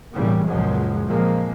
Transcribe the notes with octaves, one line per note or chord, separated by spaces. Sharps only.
B1 A2 C#3 E3 G3 A#3
C#2 F#2 A#2 F3 F#3 G#3
F2 A#2 F3 G#3 A#3